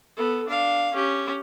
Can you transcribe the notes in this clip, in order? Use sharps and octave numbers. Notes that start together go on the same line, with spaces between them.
B3 A4
D4 F5
C#4 G4